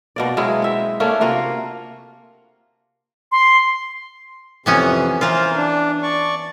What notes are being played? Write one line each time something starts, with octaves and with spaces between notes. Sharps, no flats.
B2 A#3 D5
F#3 G#3 C#4 E4
C4 E5
A3 A#3 C#4 D4
C3 A#3 F4 F#4
C6
F2 C3 E3 B3 C#4
E3 F4 A#4 C5
D4
D5 C#6